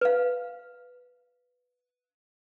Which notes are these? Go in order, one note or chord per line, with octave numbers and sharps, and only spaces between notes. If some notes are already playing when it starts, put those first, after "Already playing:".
B4 F5